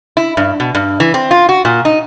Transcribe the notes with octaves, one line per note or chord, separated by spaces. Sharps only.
E4
G2
B2
G2
E3
C4
F4
F#4
A#2
D#4